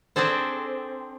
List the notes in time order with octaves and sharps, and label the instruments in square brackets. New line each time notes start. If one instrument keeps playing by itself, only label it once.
[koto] C4 D4 G#4 A4 C5